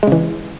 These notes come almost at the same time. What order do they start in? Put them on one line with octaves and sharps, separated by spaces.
G#3 C#3 E3